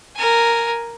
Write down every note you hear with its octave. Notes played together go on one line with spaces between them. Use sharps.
A#4 G#5